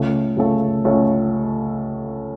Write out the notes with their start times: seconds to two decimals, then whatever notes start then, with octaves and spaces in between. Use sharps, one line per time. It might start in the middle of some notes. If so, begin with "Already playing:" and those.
Already playing: C#2 C#3 A3 C#4 A4
0.37 C#2 C#3 A3 C#4 A4
0.85 C#2 C#3 A3 C#4 A4